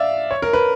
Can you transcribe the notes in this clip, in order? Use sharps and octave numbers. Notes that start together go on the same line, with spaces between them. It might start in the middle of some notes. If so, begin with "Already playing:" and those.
Already playing: D5 E5 F5
C#5
A#4
B4